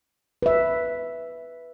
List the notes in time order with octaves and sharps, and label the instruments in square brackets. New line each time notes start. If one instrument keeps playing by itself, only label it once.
[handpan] B4 E5